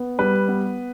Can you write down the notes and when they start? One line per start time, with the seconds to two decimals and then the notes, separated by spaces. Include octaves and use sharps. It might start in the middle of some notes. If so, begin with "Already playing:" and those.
Already playing: B3
0.19 G3 B4
0.48 B3